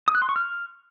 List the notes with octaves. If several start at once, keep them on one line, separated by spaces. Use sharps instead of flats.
D#6
F#6
C6
C#6
F6